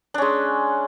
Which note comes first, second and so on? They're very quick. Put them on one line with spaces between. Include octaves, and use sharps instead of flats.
D4 C#4 G#3